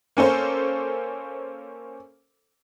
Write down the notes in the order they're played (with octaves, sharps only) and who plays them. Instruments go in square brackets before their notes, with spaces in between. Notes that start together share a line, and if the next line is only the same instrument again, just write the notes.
[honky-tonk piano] A#3 C#4 A4 C5